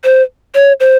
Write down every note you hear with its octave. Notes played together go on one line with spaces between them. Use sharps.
C5
C#5
C5